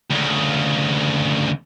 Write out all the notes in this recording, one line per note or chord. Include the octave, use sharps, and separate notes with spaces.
D2 C#3